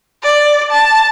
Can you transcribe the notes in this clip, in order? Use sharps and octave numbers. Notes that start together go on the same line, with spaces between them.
D5
A5